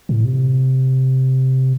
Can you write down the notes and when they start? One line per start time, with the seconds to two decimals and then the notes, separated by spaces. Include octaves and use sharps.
0.09 A2
0.25 C3